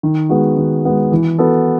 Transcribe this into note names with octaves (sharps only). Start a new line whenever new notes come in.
D#3
G#3 B3 F#4
D#3
G#3 B3 F#4
E3
B3 F#4 A4